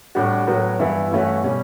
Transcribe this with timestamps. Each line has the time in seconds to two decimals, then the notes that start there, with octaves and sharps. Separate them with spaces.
0.15 A2 G3 D4 F#4
0.47 A2 F#3 B3 F#4
0.79 G2 E3 B3 E4
1.11 G2 E3 A3 C#4 F#4
1.43 B2 G3 C#4